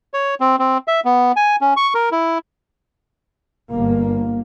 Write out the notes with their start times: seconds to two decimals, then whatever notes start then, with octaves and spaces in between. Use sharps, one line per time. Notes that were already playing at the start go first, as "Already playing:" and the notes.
0.14 C#5
0.41 C4
0.59 C4
0.88 E5
1.05 B3
1.36 G#5
1.61 C#4
1.77 C#6
1.95 A#4
2.12 E4
3.70 G1 A#3